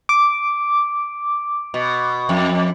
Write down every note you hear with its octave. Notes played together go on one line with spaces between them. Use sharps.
D6
B2
F2